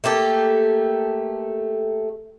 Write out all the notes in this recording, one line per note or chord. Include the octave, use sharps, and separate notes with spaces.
A3 A#3 G4 A4